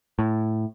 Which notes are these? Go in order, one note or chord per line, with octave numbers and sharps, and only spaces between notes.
A2